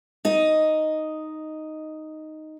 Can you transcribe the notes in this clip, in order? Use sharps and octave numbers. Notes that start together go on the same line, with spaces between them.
D#4 D#5